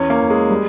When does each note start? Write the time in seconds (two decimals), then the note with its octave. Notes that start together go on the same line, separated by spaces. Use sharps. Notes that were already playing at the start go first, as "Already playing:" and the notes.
Already playing: E2 C#4
0.10 A#3
0.20 E2
0.30 G#3
0.50 G3